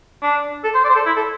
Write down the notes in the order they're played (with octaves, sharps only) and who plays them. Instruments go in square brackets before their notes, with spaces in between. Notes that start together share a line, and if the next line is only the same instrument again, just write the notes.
[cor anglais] D4
A4
C5
D5
C5
A4
E4
A4